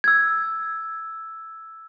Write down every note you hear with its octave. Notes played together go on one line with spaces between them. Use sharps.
E6 G#6